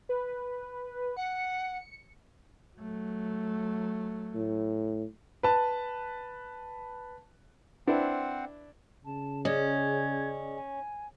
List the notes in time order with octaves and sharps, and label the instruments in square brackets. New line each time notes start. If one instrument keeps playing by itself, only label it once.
[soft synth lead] B4
[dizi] F#5 [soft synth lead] C#7
[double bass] F#3 A3
[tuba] A2
[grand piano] B4 A5
[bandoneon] C4 C5 F#5 [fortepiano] D4 E4 B4
[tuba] C#3 [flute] A5
[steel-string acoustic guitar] C#4 [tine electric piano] G#4 D5 D#5 [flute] G#6
[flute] G#5